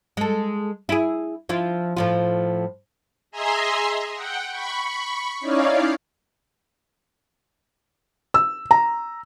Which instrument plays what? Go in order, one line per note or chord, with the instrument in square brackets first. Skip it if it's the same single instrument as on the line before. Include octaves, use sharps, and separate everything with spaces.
[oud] G#3 A4
E4 G#4
F3 E4 F4
A2 F3 F4
[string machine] G#4 D#5 E5 G#5 A#5 C6
F#5 G5
B5 C#6
C#4 D#4 E4 C#5 D5 F5
[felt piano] E6
A#5